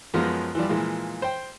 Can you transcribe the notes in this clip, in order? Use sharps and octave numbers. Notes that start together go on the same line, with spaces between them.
F#2 F3 G#3 B3
E3 F3 G3
A#2 E3 F3 G#3
C5 G5